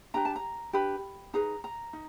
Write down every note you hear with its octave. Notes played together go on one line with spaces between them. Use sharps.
D4 G4 B4 A#5
A5
A#5
D4 G4 B4 B5
D#4 G#4 B4 A#5
A#5
D#4